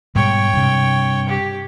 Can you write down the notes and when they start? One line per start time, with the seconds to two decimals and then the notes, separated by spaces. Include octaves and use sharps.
0.16 G#2 B2 G3 C#5 G5
0.53 G2 C3
1.29 G4